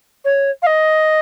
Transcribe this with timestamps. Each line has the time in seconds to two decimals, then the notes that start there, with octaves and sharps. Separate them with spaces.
0.24 C#5
0.62 F5
0.66 D#5